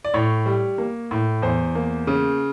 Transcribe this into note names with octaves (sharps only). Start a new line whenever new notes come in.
D5
A2 C#5
G3
A#3
A2
E2 C5
A#3
C#3